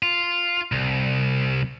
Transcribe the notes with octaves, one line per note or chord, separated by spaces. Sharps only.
F4
C2